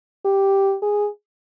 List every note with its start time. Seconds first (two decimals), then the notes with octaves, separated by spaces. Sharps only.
0.25 G4
0.82 G#4